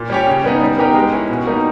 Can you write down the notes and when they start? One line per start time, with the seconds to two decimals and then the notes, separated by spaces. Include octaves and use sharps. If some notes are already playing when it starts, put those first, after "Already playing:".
Already playing: A#2
0.10 G3 C#4 G4 C#5
0.27 C#3
0.44 G3 B3 D#4
0.61 G3
0.78 B3 D#4 G4 A#4
0.95 G#3
1.13 C#4 E4
1.29 B2
1.47 G3 A#3 D#4